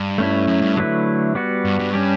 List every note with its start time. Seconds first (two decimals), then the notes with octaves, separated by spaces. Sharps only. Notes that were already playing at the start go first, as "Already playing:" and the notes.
Already playing: G2
0.18 A3 C#4 E4
0.47 F#2
0.62 G2
0.77 D3 F#3 A3 E4 B4
1.35 G3 B3 F#4
1.65 G2
1.79 G2
1.93 G3 C#4 G4